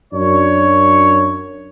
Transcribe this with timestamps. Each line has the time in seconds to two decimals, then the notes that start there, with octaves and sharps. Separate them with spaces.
0.13 F#2 D4 C#5